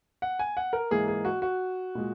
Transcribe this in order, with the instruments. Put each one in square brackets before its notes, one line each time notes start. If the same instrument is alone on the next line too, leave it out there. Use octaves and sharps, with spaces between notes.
[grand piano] F#5
G#5
F#5
A#4
G#2 E3 A#3 G#4
G#4
F#4
F#4
A#2 G#3